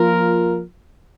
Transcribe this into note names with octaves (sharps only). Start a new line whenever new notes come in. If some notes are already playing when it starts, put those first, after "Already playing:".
Already playing: F3 A#3 F4 A#4